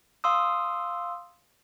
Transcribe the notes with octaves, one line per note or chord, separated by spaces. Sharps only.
F5 C6 D#6 E6